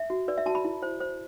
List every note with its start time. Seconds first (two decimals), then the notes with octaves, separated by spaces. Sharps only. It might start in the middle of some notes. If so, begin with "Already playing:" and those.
Already playing: E5
0.10 F#4
0.28 B4 D5
0.38 E5
0.46 F#4 A5
0.55 B5
0.65 E4
0.82 C5
1.00 C5